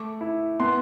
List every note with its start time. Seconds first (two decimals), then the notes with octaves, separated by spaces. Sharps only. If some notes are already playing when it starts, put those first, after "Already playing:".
Already playing: A3 D6
0.21 E4
0.60 B3 C6